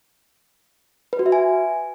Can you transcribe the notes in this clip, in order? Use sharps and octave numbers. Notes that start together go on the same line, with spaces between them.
B4
F#4
E5
G#5